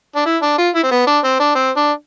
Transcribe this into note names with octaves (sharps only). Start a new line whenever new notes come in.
D4
E4
D4
F4
E4
C4
B3
D4
C4
D4
C4
D4